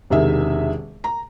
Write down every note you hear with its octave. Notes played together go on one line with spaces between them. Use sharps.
E1 C3 D#3 G#4 E5
A#5